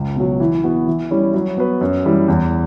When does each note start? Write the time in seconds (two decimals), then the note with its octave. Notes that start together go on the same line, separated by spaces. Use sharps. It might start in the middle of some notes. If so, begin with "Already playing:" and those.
Already playing: C#2
0.16 B2 F#3
0.40 E3
0.64 B3 F#4
0.87 E3
1.11 G3 C#4 E4
1.34 F#3
1.57 B3 F#4 B4
1.81 F#2
2.05 E3 G3
2.28 E2